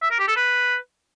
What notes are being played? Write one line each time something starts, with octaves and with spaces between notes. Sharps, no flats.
E5
A#4
G4
A4
B4